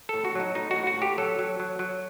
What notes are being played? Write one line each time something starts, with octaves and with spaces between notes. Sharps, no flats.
A2 A4
F#4
F#3 D#4
A2 D#4
F#4
A2
F#4
A2 G4
F#3 A4
F#3
F#3
F#3